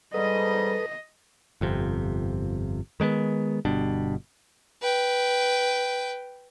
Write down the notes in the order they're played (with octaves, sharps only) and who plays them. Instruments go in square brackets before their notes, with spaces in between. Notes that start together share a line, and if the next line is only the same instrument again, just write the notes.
[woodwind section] G#2 G3 [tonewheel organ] A4 B4 D#6 [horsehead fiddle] D#5
[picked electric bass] G1 F2 C3
D#3 G#3 A3 B3
G1 B2 G3 D4
[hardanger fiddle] B4 G5